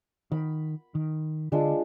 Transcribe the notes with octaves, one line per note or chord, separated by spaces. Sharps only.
D#3 B5
D#3
D3 G#3 D4 F4